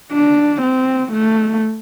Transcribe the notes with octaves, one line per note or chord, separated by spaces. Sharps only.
D4
C4
A3